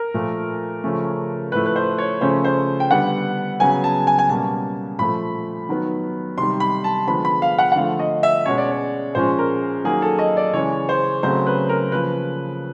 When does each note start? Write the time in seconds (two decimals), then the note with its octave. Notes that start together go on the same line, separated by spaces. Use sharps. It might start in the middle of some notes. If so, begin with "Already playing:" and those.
Already playing: A#4
0.14 A#2 F3 A3
0.84 C#3 F3 A3 C#4
1.52 A2 F3 A3 B4
1.66 B4
1.76 C5
1.98 C#5
2.21 C#3 F3 A3 C#4 C5
2.44 C5
2.80 G5
2.91 D3 G3 B3 F#5
3.60 C#3 F#3 B3 G#5
3.84 A5
4.07 G#5
4.19 G#5
4.29 B2 G3 A#3 C#4 A5
4.99 A#2 F3 A3 B5
5.69 D#3 F#3 B3
6.38 C3 D#3 G3 C6
6.60 B5
6.84 A5
7.07 D3 F3 G#3 B3 B5
7.25 B5
7.42 F5
7.58 F#5
7.72 F#5
7.76 D3 F3 A3 F5
7.99 D#5
8.23 E5
8.46 B2 G#3 C#4 C#5
8.58 D5
8.71 C#5
9.15 A#2 F3 G#3 C#4 C5
9.38 A#4
9.84 D#3 F#3 A#3 G#4
10.02 A4
10.19 D#5
10.37 D5
10.53 C#3 E3 G#3 C#4 C#5
10.89 C5
11.23 C#3 F#3 A3 C4 C5
11.47 B4
11.69 A#4
11.92 C#3 F3 A#3 B4